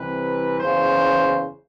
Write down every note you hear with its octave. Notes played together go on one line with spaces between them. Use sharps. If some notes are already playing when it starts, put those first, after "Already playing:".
Already playing: C2 C3 E3 B4
F#1 E2 C#3 C5